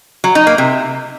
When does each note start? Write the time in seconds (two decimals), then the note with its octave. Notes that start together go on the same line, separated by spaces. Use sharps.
0.24 F#3
0.35 D#4
0.47 A#3
0.58 C3